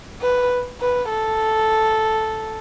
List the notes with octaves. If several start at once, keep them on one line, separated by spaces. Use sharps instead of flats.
B4
B4
A4